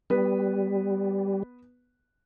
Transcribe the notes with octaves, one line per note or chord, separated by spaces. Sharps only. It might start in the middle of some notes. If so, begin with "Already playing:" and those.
G3 B3 B4